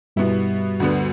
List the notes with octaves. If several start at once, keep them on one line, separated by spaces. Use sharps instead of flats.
G2 B2 G3 B3 E4
D2 D3 B3